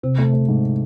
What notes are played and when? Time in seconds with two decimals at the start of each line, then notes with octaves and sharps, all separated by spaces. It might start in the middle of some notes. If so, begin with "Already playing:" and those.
0.03 C3 C4
0.18 A3
0.33 A3
0.49 G#2